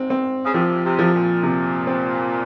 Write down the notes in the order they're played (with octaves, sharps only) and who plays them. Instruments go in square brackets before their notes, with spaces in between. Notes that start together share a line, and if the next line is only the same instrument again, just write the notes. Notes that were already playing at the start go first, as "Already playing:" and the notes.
Already playing: [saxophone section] G#2 [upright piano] C4
[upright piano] C4
[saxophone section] C#3
[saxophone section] C3 [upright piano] F3
[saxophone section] C3
[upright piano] F3
[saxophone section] A#2
[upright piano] C3
C4